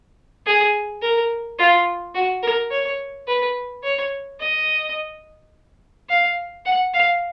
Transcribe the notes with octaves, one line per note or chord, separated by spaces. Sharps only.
G#4
A#4
F4
F#4
A#4
C#5
B4
C#5
D#5
F5
F#5
F5